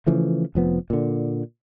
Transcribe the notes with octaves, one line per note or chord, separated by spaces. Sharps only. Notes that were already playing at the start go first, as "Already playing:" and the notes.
C#3 E3 F3 A3
F1 F3 B3
A#2 D3